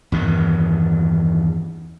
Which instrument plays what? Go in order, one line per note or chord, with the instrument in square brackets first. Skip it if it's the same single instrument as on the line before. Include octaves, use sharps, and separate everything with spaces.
[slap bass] E2 G2 D#3